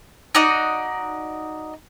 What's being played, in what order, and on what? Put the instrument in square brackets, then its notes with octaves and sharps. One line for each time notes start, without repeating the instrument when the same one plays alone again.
[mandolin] D#4 F#4 D5 D#5